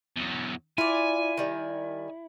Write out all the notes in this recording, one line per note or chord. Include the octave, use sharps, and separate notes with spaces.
E2 F#3
E4 F4 D5 G#5
D#3 G3